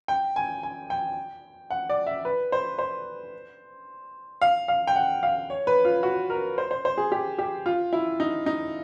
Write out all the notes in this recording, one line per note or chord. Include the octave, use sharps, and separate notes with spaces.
G5
G#5
G#5
G5
F#5
D5
E5
B4
C5
C5
F5
F5
G5
F#5
F5
C#5
B4
F4
F#4
A#4
C5
C5
C5
G#4
G4
G4
F4
E4
D#4
D#4